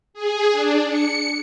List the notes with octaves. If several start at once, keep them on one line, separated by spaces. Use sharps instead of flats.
G#4
D4
C#7